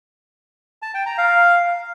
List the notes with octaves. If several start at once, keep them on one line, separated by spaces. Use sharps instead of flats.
A5
G5
A#5
F5